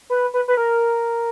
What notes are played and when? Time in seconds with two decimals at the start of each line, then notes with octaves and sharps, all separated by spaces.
0.10 B4
0.34 B4
0.48 B4
0.57 A#4